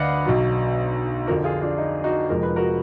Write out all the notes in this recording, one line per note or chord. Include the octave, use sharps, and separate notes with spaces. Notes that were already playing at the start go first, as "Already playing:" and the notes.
Already playing: D2 D3 B4 D5 D#5 F5 F#5
B1 B2 F#3
F2 D3 F3 F#4 A#4
F4 G#4
D4 F4
D#4
D#4 F#4
F1 F2 F3 G#3 A#4
B4
F#4 A#4